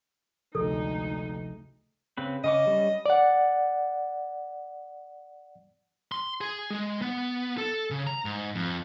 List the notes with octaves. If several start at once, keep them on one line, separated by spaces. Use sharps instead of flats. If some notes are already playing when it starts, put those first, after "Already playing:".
A1 D2 C3 F3 G#3 D#4 A4
C#3 C4 B4
C#3 C#4 D#5 D6
G3 C#4
D5 F#5
C6
G#4
G#3
B3
A4
C#3
A#5
G#2
F2